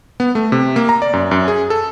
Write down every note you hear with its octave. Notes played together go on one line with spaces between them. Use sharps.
B3
A3
C3
A#3
A#5
D5
F#2
F#2
G#4
A4